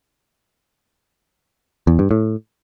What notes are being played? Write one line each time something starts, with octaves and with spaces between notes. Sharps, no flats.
E2
G2
A2